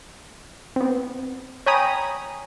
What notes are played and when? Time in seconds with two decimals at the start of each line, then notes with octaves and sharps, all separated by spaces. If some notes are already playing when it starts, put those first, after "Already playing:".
0.76 B3 C4
1.66 C#5 G5 G#5 A#5 B5 D#6